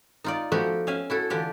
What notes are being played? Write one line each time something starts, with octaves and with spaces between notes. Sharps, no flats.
D#4 F4 D5
F3 A3 B3 F#4 G4
C#4 E5 F5 G#5
E4 F#4 A4
D3 E3 D4 F4 G4